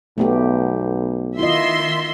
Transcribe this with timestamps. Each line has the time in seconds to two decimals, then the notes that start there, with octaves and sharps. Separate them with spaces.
0.18 B1 A3 B3 G4
1.39 D#3 E4 F4 D#5 E5 C6